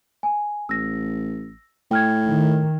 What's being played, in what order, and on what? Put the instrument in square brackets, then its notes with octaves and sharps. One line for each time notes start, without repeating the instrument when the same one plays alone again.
[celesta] G#5
[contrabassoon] A1 [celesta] E6 A#6
[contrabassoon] A2 [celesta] G5 F6 G#6
[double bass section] D#3